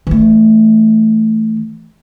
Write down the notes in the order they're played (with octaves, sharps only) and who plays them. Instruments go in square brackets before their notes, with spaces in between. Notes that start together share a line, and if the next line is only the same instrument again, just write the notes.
[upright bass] E3 A3